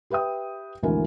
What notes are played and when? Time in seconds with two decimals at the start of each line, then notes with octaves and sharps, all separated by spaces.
0.10 G4 B4 E5 G5 D#6
0.83 G#1 D2 E3 F#4 A#4 G#5